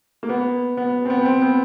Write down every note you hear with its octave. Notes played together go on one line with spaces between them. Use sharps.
A#3
B3
B3
C4
B3
C4
B3